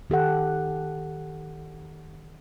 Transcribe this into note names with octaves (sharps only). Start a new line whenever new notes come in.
D#3 G4 A4 F#5